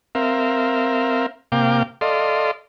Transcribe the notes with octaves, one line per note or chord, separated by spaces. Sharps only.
C4 A#4 E5 F5
C3 A#3 F5 G5 D6
A4 D5 D#5 F5 C6